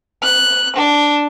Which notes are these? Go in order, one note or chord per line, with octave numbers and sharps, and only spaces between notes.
F#6
D4